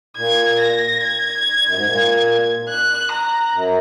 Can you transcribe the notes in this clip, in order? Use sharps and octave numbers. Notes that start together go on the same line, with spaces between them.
A#2 G#6
A#6
G#6
F#2
G#2
A#2
F#6
A#5
F#2